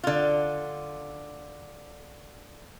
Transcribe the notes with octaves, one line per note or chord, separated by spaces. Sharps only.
D3 F4